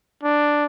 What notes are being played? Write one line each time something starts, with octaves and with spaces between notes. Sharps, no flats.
D4